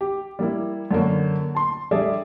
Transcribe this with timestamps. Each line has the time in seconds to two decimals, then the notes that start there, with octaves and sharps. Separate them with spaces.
0.01 G4
0.39 G3 A#3 E4
0.91 F#2 D3 F#3 A#3
1.55 A5 C6
1.91 G3 D4 G#4 A4 D5 E5